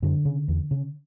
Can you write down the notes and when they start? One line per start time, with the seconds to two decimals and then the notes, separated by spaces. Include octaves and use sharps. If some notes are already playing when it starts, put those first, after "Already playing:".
0.02 F#2 D3
0.25 C#3
0.48 E2
0.71 C#3